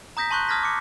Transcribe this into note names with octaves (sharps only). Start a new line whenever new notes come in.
A#5 D#6 G6 A#6 B6
A5 C6 C#6 F#6 G6
A5 D#6 F6 G#6 A#6 B6
D6 C#7